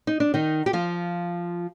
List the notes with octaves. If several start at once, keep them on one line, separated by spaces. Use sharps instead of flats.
D#4
D4
D#3 D#4
G4
F3 F4